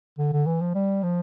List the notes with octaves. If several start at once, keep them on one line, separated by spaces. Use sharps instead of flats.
D3
D3
E3
F3
G3
F3